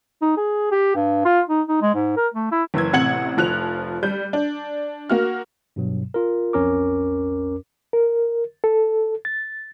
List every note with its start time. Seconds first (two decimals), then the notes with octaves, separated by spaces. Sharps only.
0.22 D#4
0.37 G#4
0.72 G4
0.95 G2
1.25 F4
1.49 D#4
1.68 D#4
1.82 G#3
1.95 G#2
2.17 A#4
2.34 A3
2.52 E4
2.74 F#1 E3 E6 G#6
2.93 A1 C3 F#5 G#6 C#7 F#7
3.37 F1 F3 F#6 F7
4.03 G3 G6
4.33 D4
5.09 A#3 F#4 F6
5.76 G2 B2 F#3
6.14 F4 A#4
6.53 B1 F2 C#4 A#4 D6
7.93 A#4
8.64 A4
9.25 A6